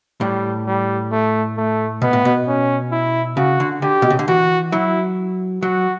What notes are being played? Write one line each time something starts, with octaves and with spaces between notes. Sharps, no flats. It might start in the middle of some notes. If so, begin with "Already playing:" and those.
A2 G3
G3
A3
A3
B2 B3
A2
B2
C#4
E4
C#3 F#4
D3
D3 G4
B2
C#3
D3
E3 F#4
F#3 E4
F#3 F#4